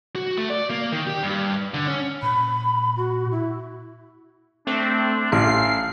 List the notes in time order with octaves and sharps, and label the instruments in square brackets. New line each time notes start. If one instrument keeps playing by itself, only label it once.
[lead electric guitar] F#4
A3
D5
A#3
D#3
G4
G2
D3
C#4
[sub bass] A#2 [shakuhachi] B5
[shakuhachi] F#4
E4
[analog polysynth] A3 C4 [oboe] D4
[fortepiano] A1 [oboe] F5 [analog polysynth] C7